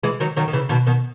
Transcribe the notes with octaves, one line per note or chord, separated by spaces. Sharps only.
E3 G#3
D#3 F#3
D#3 F#3
D#3
C#3 E3
B2 D#3
B2 D#3